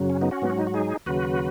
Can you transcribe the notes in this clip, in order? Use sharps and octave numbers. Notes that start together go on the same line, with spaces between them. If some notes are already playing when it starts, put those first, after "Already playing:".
Already playing: F#2 C#3 F#3
C#4
B3 D#4
C#4 F#4
G#2 F#3 B3
C#4
D#4
F#4
D#4 G#4
D#2 C#3 F#3 F#4 B4